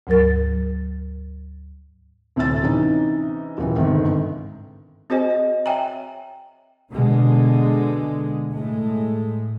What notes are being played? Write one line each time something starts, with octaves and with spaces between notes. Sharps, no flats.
D2 G#2 F#3 A#4 A6
D2 A2 C3 E6 A6
C3 E3 C#4 D#4
D#1 C#3 E3
G1 C2 G#2 D#3
C4 F#4 G#4 C5 D#5 G#5
D#5
C#5 E5 G5 G#5 A#5
B2 D3 G#3
A2 G#3 A3